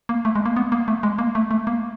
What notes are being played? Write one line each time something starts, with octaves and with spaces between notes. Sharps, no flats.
A#3
A3
G#3
A#3
B3
A#3
A3
G#3
A#3
A3
A3
A#3